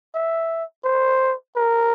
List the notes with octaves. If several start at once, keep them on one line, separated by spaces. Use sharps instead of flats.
E5
C5
A#4